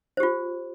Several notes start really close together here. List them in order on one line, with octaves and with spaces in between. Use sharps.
C5 G4 F4